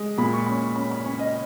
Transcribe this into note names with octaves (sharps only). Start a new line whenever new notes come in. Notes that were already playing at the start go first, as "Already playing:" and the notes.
Already playing: G#3
A#2 B5
C#6
C#4 B5
C#4 B5
B5
C#4 C#5
D#5